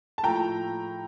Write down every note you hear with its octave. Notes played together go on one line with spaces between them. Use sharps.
A5
A2 F3 A3 G5 A#5